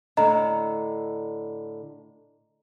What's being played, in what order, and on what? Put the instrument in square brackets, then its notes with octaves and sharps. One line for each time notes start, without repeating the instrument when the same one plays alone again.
[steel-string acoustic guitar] A2 D3 [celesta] D#5 A#5